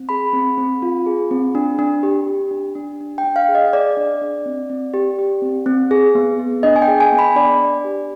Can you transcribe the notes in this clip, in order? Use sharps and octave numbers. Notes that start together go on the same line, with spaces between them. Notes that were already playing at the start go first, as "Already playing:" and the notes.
Already playing: C4
G#4 B5
C4
C4
F4
G#4
C4
D4
D4
G4
G4
D4
D4
D4
G5
D4
F5
G#4
D#5
G#4 D5
D4
D4
C4
C4
G4
G4
C4
C4
G#4
B3
B3
D4 D#5
G#5
G5
G#4
G#5
B3
B5
D4 D5
D4
G4